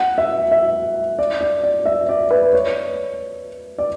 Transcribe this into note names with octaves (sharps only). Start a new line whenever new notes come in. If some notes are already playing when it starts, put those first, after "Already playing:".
Already playing: F#5
E5
E5
D5
D5
D5
E5
D5
B4
C#5
D5